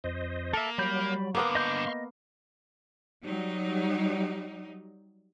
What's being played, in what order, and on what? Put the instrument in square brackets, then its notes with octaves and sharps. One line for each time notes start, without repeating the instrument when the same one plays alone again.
[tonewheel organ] F2 C5 D#5
[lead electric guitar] A#3 [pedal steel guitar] A4 E5
[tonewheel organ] F#3 [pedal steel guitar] G3 B5 G6
[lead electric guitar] G2 D3 [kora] A#3 B3 A#4
[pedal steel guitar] D#5 G6 [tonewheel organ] F5 C6 C#6
[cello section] F#3 G3 D#4